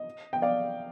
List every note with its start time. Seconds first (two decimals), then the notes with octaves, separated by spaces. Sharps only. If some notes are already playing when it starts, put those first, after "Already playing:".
Already playing: D#5
0.33 G5
0.42 D5 F5